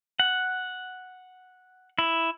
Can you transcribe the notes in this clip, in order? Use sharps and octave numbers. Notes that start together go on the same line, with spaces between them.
F#5
E4